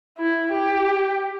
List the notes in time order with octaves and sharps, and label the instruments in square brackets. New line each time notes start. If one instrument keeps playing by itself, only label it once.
[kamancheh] E4
G4